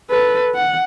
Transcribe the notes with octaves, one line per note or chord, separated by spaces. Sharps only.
A4 B4
F#5